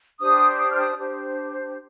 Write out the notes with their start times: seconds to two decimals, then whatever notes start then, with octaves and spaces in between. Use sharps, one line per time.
0.20 D4 G4 C5 D#6
0.59 D#6
0.70 F6
0.80 D#6
0.98 D4 G4 C5